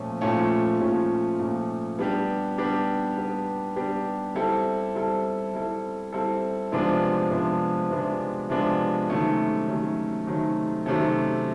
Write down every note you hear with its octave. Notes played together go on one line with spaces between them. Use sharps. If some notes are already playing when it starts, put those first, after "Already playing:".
Already playing: A#2 F3 A3 C#4
A#2 F3 A3 C#4
A#2 F3 A3 C#4
A#2 F3 A3 C#4
G3 B3 D4 G4
G3 B3 D4 G4
G3 B3 D4 G4
G3 B3 D4 G4
G3 C4 E4 A4
G3 C4 E4 A4
G3 C4 E4 A4
G3 C4 E4 A4
C3 F3 G#3 B3 D4
C3 F3 G#3 B3 D4
C3 F3 G#3 B3 D4
C3 F3 G#3 B3 D4
C3 D#3 F#3 A3 C#4
C3 D#3 F#3 A3 C#4
C3 D#3 F#3 A3 C#4
C3 D#3 F#3 A3 C#4